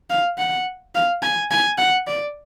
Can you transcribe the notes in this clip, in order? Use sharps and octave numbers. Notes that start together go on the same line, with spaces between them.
F5
F#5
F5
G#5
G#5
F#5
D5